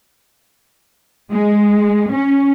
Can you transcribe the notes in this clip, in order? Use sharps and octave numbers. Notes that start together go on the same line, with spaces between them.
G#3
C#4